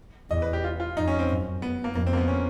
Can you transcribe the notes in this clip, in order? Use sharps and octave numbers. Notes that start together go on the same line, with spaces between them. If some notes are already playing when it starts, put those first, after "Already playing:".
E2 D#5
B4
G4
F4
F4
F2 D#4
C#4
C4
F#2
B3
A#3
F2 A#3
C4
A#3
B3
C#4